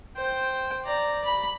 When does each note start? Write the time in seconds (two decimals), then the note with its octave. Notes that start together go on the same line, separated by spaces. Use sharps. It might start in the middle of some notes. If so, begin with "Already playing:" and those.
0.17 C5 G5
0.85 D5 A#5
1.25 B5